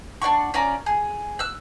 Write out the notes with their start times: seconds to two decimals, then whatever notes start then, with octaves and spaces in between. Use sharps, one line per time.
0.22 D4 D5 F#5 C#6
0.54 C#4 F4 D5 A#5
0.86 G#4
1.39 E6 F#6